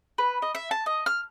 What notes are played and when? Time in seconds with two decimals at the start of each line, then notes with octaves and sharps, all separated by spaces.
0.18 B4
0.42 D#5
0.55 E5
0.71 A5
0.86 D#5
1.06 F6